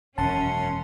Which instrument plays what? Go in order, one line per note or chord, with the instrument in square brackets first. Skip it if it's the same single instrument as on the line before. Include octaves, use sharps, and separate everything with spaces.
[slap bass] E1 D#3 [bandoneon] F#2 F#5 C6 [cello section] C#4 [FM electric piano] A5